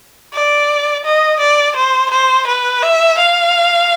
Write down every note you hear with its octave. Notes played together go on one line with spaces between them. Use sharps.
D5
D#5
D5
C5
C5
B4
E5
F5